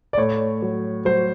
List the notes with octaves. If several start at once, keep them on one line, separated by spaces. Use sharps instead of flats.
D5
A2 C#5
F#3
F#3 C5